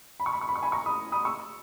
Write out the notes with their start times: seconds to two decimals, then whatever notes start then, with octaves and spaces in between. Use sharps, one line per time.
0.20 B5
0.26 C#6
0.33 B5
0.41 C#6
0.49 B5
0.56 C#6
0.63 G#5 B5
0.72 A#5 C#6
0.86 B5 D#6
1.12 B5 D#6
1.25 C#6 E6